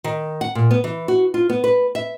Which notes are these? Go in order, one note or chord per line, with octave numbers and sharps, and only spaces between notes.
D#3
F#5
A#2
B3
E3
F#4
F4
B3
B4
E5